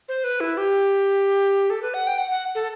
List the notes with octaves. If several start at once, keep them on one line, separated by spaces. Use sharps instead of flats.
C5
B4
E4
G4
A4
B4
F#5
G5
F#5
F#5
A4